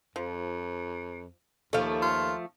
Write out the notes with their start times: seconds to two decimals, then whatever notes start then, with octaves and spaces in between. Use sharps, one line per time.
0.16 F2 F3
1.73 D#2 F3 A3 A4 F5
2.02 F4